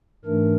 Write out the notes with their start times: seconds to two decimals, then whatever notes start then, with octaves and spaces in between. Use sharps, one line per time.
0.25 G#2 E3 A3 D4 A#4